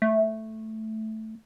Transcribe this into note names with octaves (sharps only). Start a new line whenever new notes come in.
A3